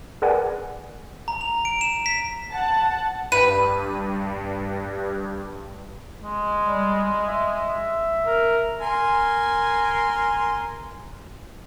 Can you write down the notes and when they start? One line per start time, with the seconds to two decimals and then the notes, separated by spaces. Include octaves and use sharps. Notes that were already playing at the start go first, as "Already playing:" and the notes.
0.22 G#4 A#4 B4 D5 F#5 G#5
1.28 A#5
1.41 F7
1.65 D7
1.81 E7
2.06 B6
2.52 F#5 A5
3.32 G2 B4 D#7
6.22 G#3
6.62 G3
7.28 E5
8.26 A#4
8.81 A#4 G#5 C6